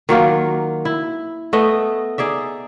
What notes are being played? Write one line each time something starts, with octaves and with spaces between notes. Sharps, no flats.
D#3 F#3 A#3 F4
E4
A3 B3 B4 D#5
D#4 G#4 D5 E5